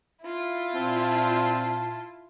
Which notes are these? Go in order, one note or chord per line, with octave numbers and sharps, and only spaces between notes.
E4 F4
A#2 C4 A5